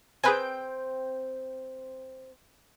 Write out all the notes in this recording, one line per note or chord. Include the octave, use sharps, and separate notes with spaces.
C4 G#4 B4 G5 G#5